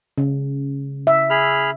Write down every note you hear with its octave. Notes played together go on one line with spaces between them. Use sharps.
C#3
E5
G#4 B5 F6